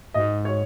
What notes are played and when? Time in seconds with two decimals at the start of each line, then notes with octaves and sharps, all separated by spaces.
0.14 G#2 D#5
0.45 C#5